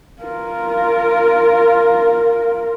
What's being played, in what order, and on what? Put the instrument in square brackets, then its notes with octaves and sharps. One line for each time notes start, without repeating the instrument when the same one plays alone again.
[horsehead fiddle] F4 A#4